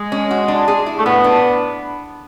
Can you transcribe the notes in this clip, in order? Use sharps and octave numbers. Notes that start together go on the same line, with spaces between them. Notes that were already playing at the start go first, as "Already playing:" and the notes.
Already playing: G#3
C#4
F#4
D4
G#4
E4
A3
A2 B3
D4